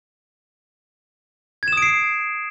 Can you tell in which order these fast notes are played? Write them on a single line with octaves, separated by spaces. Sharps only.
G#6 E7 D#6 D7 C7